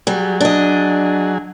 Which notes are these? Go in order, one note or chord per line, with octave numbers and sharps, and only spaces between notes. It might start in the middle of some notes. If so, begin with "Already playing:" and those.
F#3 G3 G#4
D4 D#5